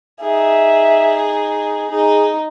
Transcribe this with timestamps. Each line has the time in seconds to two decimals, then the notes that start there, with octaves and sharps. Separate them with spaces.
0.21 D#4 G#4 E5
1.91 D#4 G#4